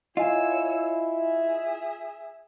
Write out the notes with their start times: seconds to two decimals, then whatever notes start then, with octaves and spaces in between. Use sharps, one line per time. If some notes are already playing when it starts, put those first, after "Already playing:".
0.17 E4 F4 C#5 D#5 G#5 E6
1.16 G#4 E5